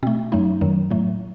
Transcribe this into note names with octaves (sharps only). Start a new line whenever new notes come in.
B2 A3 C4
F#2 F#3 A3 D#4
F#2 D#3 F#3
A2 F#3 A3